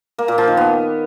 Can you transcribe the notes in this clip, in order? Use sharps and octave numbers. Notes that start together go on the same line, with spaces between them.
A#3
A#2
F3
D#3
B3